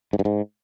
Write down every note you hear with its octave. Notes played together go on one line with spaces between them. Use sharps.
G#2
G2
G#2